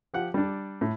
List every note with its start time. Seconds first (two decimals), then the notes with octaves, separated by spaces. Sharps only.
0.14 F3 G4 F#5
0.34 G3 D4
0.81 A2